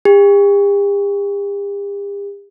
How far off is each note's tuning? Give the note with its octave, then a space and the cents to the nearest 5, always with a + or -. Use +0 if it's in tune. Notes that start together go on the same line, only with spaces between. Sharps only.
G4 +45